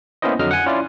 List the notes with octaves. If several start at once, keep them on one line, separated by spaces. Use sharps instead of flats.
A#3 B3 C#4 E4 C5 D#5
F2 D3 F#3 D#5 F6
F#5 G#5
C#4 E4 F4 D5